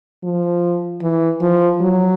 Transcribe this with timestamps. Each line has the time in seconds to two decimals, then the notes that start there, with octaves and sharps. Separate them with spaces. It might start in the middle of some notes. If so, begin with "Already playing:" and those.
0.23 F3
1.02 E3
1.41 F3
1.80 F#3